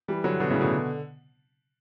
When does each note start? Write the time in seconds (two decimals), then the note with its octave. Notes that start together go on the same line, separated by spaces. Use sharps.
0.08 E3 G3
0.24 D3 F#3
0.40 B2 D3
0.50 A2 C#3
0.61 B2 D3